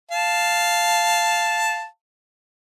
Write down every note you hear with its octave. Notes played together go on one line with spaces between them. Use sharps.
F5 A5